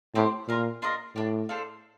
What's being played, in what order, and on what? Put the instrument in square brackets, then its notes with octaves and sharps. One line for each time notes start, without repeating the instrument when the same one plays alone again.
[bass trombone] A2 [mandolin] C4 G4 C5
[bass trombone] A#2 [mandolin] F4 A#4 F5
[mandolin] D4 F4 A#4 D#5
[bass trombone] A2 [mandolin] D4 G4 D5
[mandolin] D4 A4 C5 F5